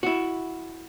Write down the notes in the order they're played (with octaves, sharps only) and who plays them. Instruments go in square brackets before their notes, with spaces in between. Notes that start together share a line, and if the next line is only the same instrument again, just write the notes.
[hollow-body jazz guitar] E4 F#4